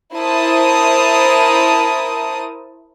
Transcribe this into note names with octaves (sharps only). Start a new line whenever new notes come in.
E4 A#4 C5 A5 D#6